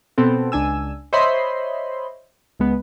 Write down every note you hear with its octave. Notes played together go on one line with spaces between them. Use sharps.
B2 B3 C4 A4
C#2 D4 G#5 E6
C5 C#5 D#5 E5 B5 C6
C#2 G#3 B3